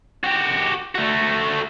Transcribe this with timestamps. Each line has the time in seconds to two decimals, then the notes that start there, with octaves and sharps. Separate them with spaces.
0.24 F#4 G4
0.95 A3 F#4